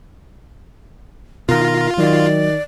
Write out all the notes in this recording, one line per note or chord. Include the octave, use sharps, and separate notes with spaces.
B2 D#3 F4 A#4
D#3 F#3 D5